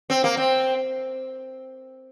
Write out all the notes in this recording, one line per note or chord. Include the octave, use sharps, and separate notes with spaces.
C4
A#3
C4